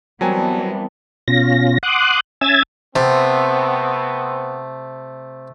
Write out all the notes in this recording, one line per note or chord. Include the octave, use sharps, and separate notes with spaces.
E3 F#3 G3 B3 C4 A#4 G#5 A5
B2 C#4 F4 A#6
F#5 C6 D6 D#6 F#6
C#4 E5 G#5 E6 G#6 A6
C3 A3 B3 C4